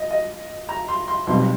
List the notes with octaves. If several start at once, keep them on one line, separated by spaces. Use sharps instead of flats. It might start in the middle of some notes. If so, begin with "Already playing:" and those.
Already playing: D#5
D#5
A#5
C6
C6
B1 B2 G3 C4 C6